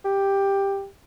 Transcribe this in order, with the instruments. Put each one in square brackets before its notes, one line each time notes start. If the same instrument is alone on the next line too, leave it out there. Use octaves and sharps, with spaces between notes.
[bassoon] G4